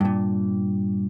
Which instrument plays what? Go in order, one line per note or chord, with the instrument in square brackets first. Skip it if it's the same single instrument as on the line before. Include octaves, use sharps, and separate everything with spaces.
[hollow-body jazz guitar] G2 A#2